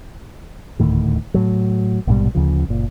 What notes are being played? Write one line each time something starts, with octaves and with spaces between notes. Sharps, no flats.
D#1 D2 A2 D#3
A2 F#3
A#1 G#2 B2 G3
D2 C#3 F3
F#1 A#2